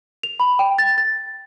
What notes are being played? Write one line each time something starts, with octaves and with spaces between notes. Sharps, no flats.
F7
B5
G5
A6
A6